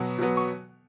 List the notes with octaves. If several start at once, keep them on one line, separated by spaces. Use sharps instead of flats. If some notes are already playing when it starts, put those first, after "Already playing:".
Already playing: B2 F#3 B3
B2 F#3 B3
C#6